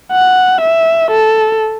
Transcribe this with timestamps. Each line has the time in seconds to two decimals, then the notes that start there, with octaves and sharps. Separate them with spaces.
0.12 F#5
0.61 E5
1.11 A4